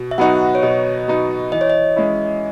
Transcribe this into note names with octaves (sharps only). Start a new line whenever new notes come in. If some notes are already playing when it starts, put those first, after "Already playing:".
Already playing: B2
E5
F#3 B3 D#4 F#4 F#5
C#5
B2 D#5
F#3 B3 D#4 F#4
E3 D#5
C#5
D#5
G#3 C#4 E4